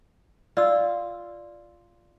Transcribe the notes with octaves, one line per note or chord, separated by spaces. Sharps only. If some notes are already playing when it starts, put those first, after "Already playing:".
F4 D5 E6